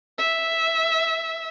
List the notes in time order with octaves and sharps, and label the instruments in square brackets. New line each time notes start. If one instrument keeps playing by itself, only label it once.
[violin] E5